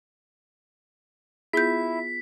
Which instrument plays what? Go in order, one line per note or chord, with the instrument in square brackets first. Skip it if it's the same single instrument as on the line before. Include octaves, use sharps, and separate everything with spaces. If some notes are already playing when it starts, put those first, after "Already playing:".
[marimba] B3 F4 [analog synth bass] E4 [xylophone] G#4 G6 [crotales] B6